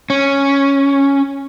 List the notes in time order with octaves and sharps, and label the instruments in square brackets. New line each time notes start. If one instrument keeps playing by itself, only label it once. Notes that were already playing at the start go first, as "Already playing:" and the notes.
[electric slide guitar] C#4